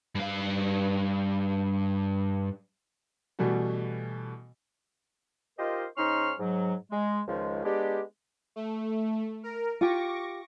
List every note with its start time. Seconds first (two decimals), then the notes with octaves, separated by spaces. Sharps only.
0.15 G2 F5
3.39 B2 E3 G3 A3 F#4
5.59 D#4 F4 G4 A#4 C5 D#5
5.97 G#2 C#4 D#4 C6 C#6 F6
6.40 G#2 F#3
6.91 G#3
7.28 C#2 D#3 F3 G#3
7.64 G#3 B3 D4 G4
8.56 A3
9.43 A#4
9.81 F4 G4 C#6 D6 A#6